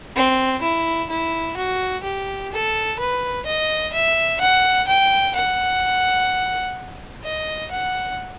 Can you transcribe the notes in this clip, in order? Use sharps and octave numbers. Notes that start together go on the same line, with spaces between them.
C4
E4
E4
F#4
G4
A4
B4
D#5
E5
F#5
G5
F#5
D#5
F#5